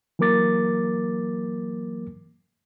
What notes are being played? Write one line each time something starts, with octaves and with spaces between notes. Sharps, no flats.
E3 F#3 A#3 A#4 D6 A6